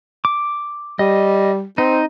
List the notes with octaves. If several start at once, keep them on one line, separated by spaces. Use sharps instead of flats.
D6
G3 D#5
C4 D#4